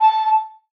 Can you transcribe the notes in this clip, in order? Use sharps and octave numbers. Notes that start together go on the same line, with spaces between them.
A5